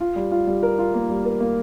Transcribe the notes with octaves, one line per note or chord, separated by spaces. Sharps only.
F4
G3
F4
G3
A#4
F4
A#3
G3
A#4
A#3